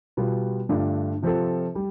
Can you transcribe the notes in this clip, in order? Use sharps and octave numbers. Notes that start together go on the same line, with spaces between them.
B2 G3 B3 F4
G2 D3 A3 D4 F4
C3 F3 C4 F4 A4
G3